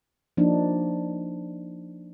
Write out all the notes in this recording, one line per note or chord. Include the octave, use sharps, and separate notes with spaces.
F3 A#3 D4 D#4